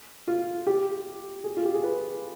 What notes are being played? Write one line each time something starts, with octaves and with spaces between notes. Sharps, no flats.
F4
G4
G#4
F4
G4
G#4
B4